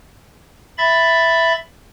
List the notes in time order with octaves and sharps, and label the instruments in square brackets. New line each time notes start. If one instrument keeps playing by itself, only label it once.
[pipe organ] E5 B5 A6